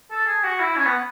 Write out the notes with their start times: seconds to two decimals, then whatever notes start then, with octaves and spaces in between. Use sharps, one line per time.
0.11 A4
0.27 G#4
0.44 F#4
0.60 E4
0.76 C#4
0.86 B3